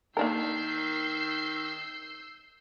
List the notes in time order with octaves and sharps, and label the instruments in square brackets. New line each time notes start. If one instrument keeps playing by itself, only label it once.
[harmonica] D#3 [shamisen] A#3 D4 A#4 [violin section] E6 G6 C7